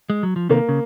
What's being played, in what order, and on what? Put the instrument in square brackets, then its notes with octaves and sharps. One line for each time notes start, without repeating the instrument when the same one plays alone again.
[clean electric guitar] G#3
F#3
F3
[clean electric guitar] C3 D#3 [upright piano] A#3
[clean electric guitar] C#3